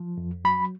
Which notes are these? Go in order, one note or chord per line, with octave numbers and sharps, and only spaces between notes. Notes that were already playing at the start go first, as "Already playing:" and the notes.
Already playing: F3
F2
F#3 B5